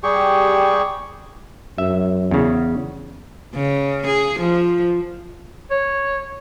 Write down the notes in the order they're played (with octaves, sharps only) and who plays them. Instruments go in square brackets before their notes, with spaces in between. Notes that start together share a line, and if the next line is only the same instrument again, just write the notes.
[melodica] G3 G4 G#4 C#6
[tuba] F#2 [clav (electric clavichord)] E5
[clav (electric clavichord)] E2 C#3
[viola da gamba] C#3
G#4
F3
[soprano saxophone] C#5